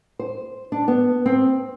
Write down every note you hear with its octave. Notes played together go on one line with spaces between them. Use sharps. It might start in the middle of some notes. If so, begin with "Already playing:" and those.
C5
D4
B3
C4